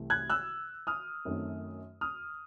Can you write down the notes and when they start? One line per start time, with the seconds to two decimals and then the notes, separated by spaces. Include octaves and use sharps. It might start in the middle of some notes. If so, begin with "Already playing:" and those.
Already playing: C2 C3 E3 A3 C4
0.10 F#6 G#6
0.30 E6 F#6
0.87 D#6 F6
1.25 F#2 D#3 F#3 A3 C4
2.01 D#6 F6